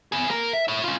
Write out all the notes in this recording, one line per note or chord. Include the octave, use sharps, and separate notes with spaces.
B3 G#4
A#3 A#4
E5
E4 C#5
C#4 F4